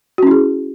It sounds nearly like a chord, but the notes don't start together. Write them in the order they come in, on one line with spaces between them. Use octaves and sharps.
F#4 C#4 E4 G#4